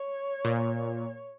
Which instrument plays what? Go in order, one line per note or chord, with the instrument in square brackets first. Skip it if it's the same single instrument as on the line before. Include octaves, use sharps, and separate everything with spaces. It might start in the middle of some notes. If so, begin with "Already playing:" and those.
Already playing: [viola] C#5
[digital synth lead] A#2